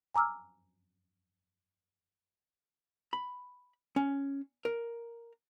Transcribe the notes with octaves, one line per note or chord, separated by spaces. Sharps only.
G#5 A#5 D6 E6 F6
B5
C#4
A#4